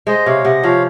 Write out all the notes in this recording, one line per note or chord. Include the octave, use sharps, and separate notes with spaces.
G#3 C5 D#5
C3 C#5 F5
C3 D#5 F#5
F3 C#5 F5